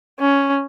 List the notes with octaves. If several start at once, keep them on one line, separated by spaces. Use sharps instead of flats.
C#4